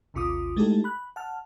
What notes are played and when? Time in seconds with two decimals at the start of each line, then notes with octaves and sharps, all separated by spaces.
0.14 A1 D#2 C3 F4 D6 D#6
0.56 G#3 A3 D#4 E4 G4 A4
0.84 B5 F#6
1.16 F#5 A5 F6